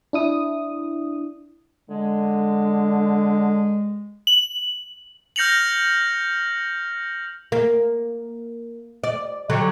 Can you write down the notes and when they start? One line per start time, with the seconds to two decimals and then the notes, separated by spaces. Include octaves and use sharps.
0.13 D4 E4 D#6
1.90 D3 G#3
4.27 F#7
5.36 F6 G6 A#6 C#7 F7 F#7
7.52 A#3
9.04 D5
9.50 D3 F#3 G3